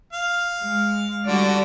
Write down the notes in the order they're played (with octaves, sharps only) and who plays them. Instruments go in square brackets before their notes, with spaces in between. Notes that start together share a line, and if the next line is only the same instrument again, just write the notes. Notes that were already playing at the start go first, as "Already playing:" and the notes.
[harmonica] F5
[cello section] G#3
[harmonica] D3 [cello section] G3 F#4 D5